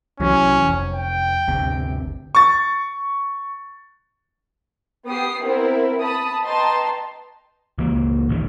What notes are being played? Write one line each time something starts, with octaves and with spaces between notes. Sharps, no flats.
C2 E3 F#3 C#4
F1
G5
G1 D2 C3
C#6 A6
B3 G4 D#6 C7
B3 C4 E4 A#4 C5
A5 B5 D#6
B4 D#5 G5 A5 A#5 C6
C#2 E3 A#3
A1 D#3